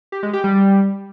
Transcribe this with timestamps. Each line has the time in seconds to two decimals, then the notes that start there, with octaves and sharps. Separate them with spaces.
0.12 G4
0.23 G#3
0.33 G4
0.44 G3